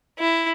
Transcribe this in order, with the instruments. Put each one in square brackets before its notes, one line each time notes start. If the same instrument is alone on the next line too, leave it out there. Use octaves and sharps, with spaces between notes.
[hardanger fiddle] E4